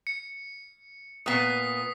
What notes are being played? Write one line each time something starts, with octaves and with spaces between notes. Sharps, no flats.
C#7
A#2 B3 D#6 B6 C7